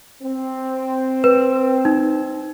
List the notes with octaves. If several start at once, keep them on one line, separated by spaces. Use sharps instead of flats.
C4
B4
D#4